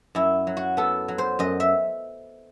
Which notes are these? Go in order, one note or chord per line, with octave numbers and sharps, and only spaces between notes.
F#2 E4
F#3
F#4
B3 A4
F#3
C5
F#2 D#5
E5